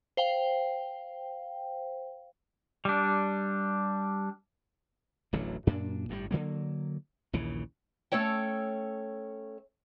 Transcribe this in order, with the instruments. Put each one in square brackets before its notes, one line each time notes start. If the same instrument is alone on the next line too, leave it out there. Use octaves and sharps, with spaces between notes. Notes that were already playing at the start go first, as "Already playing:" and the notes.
[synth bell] C5 F5 G5
[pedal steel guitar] G3 D4
[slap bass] D1 A1 D3 F#3
F#2 A#2 D4
G1 A2 D3 G3
D3 D#3 F#3 A#3
A#1 D#2 C#3 E3
[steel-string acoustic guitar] A3 C#4 A4 C#5 G5